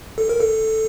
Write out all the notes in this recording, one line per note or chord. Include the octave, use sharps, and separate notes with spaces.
A4
A#4
A4